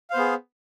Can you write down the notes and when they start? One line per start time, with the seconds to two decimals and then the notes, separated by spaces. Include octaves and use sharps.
0.10 F5
0.13 C5
0.16 B3
0.19 G#4